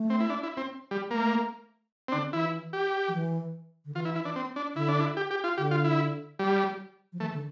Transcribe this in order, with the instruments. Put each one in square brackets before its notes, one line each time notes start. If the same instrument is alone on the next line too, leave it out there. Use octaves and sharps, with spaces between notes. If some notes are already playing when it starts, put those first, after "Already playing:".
Already playing: [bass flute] A3
[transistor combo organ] C4
E4
D4
E4
C4
G3
[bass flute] A3 [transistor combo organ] A#3
[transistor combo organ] C4
[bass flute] D3 [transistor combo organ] D4
[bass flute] E3 [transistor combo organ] E4
[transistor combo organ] G4
[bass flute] F3
E3
D3
[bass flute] E3 [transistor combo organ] F4
[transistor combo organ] E4
E4
D4
C4
D4
[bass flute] D3 [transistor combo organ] E4
[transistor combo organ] D4
E4
G4
G4
F4
[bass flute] D3 [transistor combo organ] G4
[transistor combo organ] F4
E4
G3
[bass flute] F3
[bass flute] E3 [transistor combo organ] A3
[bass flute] D3